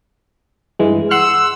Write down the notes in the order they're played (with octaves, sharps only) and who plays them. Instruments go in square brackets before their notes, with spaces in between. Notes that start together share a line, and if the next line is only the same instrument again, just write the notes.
[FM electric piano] G2 E3 G#3
[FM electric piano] F#5 C6 F#6 [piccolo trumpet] E6